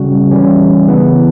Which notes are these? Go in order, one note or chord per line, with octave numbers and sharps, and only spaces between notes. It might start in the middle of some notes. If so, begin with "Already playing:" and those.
Already playing: C#3 G3 C#4 F#4
E3 G3 C#4
C#3 E3 B3 E4